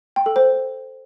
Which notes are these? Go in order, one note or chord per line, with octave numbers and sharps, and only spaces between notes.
G5
A4
C5